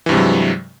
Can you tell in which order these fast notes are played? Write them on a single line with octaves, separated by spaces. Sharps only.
E3 G2 C3 G#3 F#3